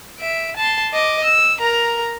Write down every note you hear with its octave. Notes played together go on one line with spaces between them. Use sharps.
E5 D7
A5 C6
D#5 D6
E6
A#4 A#5